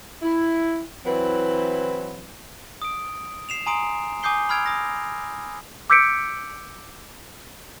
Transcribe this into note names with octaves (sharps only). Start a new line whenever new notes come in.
E4
E3 F#3 C4 E4 B4
D#6 D7
C7 E7 F7
G#5 A#5 C6 D#6 C7 D7
G#5 D6 D#6 G6 C7 G7
B5 E6 F6 G#6 D7 F7
D#6 A#6
D6 E6 G6 B6 C#7 D7